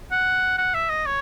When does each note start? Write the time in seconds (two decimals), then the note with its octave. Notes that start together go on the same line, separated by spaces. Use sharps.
0.12 F#5
0.58 F#5
0.74 E5
0.90 D#5
1.06 C#5